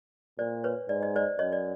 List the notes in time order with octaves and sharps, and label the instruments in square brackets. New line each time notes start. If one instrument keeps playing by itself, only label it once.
[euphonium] A#2 [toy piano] C5 D5
[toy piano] B4 C#5
[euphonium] G#2 [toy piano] D5
[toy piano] D#5
C5 D5
[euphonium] F#2 [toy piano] C#5 D#5
[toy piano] D5